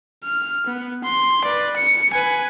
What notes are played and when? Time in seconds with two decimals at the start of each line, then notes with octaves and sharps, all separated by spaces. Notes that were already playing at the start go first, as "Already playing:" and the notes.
0.24 F6
0.66 B3
1.04 C6
1.45 B4 D5
1.76 C#7
2.13 B4 G#5